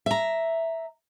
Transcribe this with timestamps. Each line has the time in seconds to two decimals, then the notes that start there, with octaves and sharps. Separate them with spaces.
0.06 E5 A#5